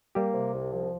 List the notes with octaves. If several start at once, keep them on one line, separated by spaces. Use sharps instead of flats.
G3 A#3 G4
C3
C2
F3